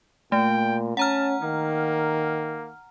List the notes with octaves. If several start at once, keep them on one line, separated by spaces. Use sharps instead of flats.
A#2 A3 G5
C#4 F#5 A5 A#5 F6
D#3 A#3